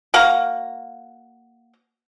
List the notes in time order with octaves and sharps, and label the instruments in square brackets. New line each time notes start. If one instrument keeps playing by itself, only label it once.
[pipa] A#3 F#4 F5 A#5